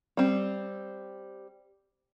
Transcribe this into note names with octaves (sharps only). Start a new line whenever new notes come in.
G3 C4